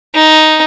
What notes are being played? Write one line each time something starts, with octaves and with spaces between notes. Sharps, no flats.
D#4